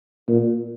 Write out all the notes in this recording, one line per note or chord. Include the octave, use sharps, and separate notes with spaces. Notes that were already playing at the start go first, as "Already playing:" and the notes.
A#2